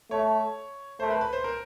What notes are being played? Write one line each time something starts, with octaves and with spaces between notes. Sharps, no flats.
A3 C#5
A3 C5
A#4
B4
B4
C5
A#4